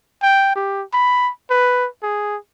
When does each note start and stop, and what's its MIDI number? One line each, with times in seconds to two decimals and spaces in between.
0.22 0.51 79
0.56 0.83 67
0.93 1.30 83
1.50 1.88 71
2.03 2.37 68